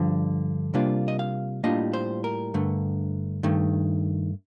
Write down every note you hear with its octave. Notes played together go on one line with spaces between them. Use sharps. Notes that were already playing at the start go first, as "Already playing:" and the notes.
Already playing: G2 D3 F3
C3 G3 A#3 D4 F4
D#5
F5
A2 G3 A#3 D4 F4 D#5
C5
A#4
G2 D3 A3
G2 D#3 A3